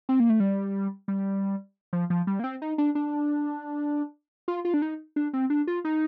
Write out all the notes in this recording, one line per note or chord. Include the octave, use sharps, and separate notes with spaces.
C4
A#3
A3
G3
G3
F3
F3
G3
A#3
C4
D#4
D4
D4
F4
F4
D4
D#4
D4
C4
D4
F4
D#4